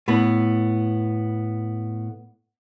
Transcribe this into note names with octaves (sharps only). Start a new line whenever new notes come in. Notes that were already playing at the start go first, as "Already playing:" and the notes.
A2 B3 B4